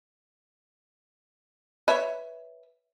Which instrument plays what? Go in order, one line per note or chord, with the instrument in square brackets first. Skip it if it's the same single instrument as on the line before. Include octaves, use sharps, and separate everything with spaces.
[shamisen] B4 C#5 E5